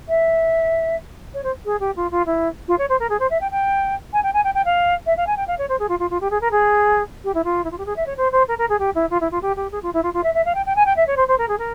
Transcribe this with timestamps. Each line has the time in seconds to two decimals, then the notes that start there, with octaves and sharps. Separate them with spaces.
0.08 E5
1.34 C#5
1.43 C5
1.65 G#4
1.80 G4
1.96 F4
2.11 F4
2.26 E4
2.68 F4
2.78 C#5
2.89 C5
2.99 A#4
3.09 G#4
3.19 C5
3.30 E5
3.40 G5
3.51 G5
4.13 G#5
4.23 G5
4.33 G#5
4.44 G5
4.54 G5
4.65 F5
5.06 E5
5.17 F5
5.26 G#5
5.36 G5
5.47 F5
5.58 C#5
5.68 C5
5.79 G#4
5.88 F4
5.99 F4
6.10 F4
6.20 G4
6.30 G#4
6.41 A#4
6.51 G#4
7.24 G4
7.34 E4
7.44 F4
7.64 E4
7.71 F4
7.78 G4
7.85 G#4
7.96 E5
8.06 C#5
8.17 C5
8.31 C5
8.48 A#4
8.58 A#4
8.69 G#4
8.79 G4
8.95 E4
9.10 F4
9.20 E4
9.31 F4
9.41 G4
9.56 G4
9.71 G#4
9.82 F4
9.93 E4
10.03 F4
10.13 F4
10.23 E5
10.34 E5
10.45 F5
10.54 G5
10.66 G5
10.75 G#5
10.85 G5
10.96 E5
11.07 C#5
11.16 C5
11.27 C5
11.38 A#4
11.48 G#4
11.58 A#4